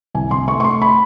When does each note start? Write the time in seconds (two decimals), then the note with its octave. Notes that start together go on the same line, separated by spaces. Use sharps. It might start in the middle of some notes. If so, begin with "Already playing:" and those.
0.14 C2 G#5
0.31 C2 C6
0.48 A3 C#6
0.60 C#6
0.64 A3 C6
0.82 B5